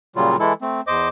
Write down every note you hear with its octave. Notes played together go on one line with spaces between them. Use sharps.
A#2 C#3 F#3 G3 F4
E3 G#3 E4 A4
A3 C4
E2 C5 D#5 D6